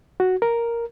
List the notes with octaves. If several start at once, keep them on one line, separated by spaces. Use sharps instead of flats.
F#4
A#4